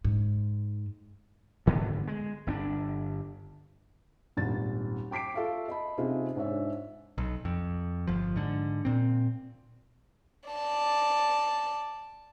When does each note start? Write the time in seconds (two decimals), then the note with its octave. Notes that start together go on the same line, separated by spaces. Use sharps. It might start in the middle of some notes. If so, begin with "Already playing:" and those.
0.05 G#2
1.66 D2 G#2 D3 B3
2.07 G#3
2.47 G1 C4 D4
4.37 D#1 G#1 A6
5.11 G5 D6 B6 C7 D7
5.34 F4 A4 E5 F5 C#6
5.68 D#5 A5 B5
5.98 C3 C#4 D#4 F4 G#4
6.36 G#2 D4 C#5 E5
7.18 B1
7.45 F2
8.07 G1 F3
8.36 G#2 D3
8.85 A#2 C4
10.50 D5 A5